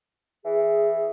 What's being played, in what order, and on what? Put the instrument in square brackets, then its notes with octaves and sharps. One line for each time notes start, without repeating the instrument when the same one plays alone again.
[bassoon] E3 [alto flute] G#4